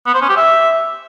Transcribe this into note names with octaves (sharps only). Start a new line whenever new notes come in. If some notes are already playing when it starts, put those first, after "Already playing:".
B3
C5
C#4
G4
E5